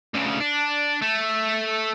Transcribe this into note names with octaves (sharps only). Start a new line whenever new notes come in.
D2 C#3
D4
A3